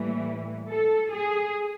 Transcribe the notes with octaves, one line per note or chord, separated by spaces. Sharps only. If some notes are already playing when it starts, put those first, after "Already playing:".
Already playing: A2 E3 G3 A#3
A4
G#4